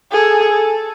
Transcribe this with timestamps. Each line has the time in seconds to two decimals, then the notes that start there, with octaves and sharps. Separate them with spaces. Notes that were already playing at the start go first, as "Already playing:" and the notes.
0.12 G#4 A4
0.51 A4